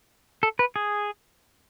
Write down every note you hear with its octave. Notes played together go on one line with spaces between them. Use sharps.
A4
B4
G#4